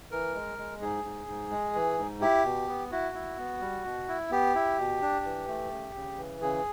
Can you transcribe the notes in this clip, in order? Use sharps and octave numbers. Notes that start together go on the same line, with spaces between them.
E3 A#4
G#3
G#3
G#2 G#4
G#2
G#2
G#3
E3
G#2
E4 G4
B2
B3
E4 F#4
E4
B3
G3
B2
E4
B3 G4
E4
B2
D4
E3
A3
C#3
C#3
E3
C#3 G#4